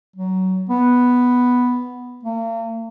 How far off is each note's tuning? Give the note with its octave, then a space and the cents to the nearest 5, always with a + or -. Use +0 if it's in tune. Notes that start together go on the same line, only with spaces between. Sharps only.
F#3 +20
B3 +0
A#3 -40